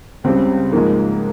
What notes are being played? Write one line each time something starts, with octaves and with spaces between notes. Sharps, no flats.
C#2 C#3 G3 C4
G#2 F3 G#3 A#3